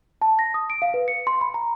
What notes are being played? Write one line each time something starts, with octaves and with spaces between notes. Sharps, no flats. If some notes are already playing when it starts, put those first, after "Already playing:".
A5
A#6
D#6
D7
F5
B4
C#7
C6
B5
A#5